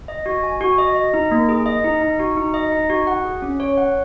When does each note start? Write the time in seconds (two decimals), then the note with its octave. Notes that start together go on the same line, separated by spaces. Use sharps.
0.08 D#5
0.26 F#4
0.43 G#5
0.61 F#4
0.78 D#5
0.96 D#5
1.14 D#4
1.31 A#3
1.49 G#4
1.66 D#5
1.84 D#4
2.01 D#4
2.20 F#4
2.37 D#4
2.54 D#5
2.72 D#4
2.90 F#4
3.07 F#5
3.25 G#4
3.42 C#4
3.60 C#5
3.77 F#5